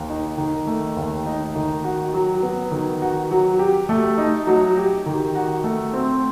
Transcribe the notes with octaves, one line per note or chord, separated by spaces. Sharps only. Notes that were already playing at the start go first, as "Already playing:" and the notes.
Already playing: D#2
D#4
D#3
A3
D#2
D#4
D#3
F#4
F#3
B3
D#3
F#4
F#3
G4
A3
D#4
F#3
G4
D#3
F#4
A3
C4